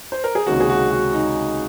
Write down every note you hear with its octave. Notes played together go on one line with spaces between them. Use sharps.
C5
A#4
G#4
C#2 C3 D#3 A#3 C#4 F#4
G#4
F#4
F#4
D#4